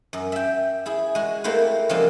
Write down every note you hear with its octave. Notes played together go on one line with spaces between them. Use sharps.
F#2
E5 G5
E4 G#4
G#3 F#4
A3 A#3 C4 E4 B4 C5
C#3 F3 G3 G#3 A#3 C4